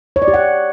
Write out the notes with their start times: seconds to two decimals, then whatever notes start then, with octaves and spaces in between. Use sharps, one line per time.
0.16 C#5
0.22 D5
0.28 G4
0.34 F#5